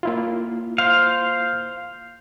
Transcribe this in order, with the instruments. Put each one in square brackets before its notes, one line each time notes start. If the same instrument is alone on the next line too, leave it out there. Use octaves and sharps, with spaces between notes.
[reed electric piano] A#3 E4 F4
[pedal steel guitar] C5 F5